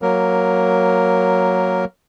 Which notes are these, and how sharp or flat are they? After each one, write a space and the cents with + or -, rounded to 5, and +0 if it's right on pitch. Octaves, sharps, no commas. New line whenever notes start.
F#3 +0 A#3 +0 A#4 +0